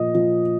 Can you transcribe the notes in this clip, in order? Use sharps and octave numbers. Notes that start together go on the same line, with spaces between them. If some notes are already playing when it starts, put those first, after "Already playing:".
Already playing: A#2 F3 D#5
F3